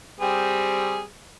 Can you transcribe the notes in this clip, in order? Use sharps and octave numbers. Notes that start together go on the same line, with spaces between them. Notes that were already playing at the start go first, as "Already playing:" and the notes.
G3 C4 G#4